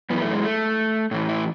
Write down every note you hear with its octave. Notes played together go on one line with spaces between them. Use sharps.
F#2 E3 B3
A3
G#3
A3
A2 E3
E4